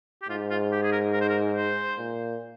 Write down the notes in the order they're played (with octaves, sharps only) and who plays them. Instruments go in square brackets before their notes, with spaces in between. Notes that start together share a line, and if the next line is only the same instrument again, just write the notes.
[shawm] G4
[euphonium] G#2 [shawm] F4
[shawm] F4
G4
G#4
A#4
A#4
C5
A#4
C5
[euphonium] A#2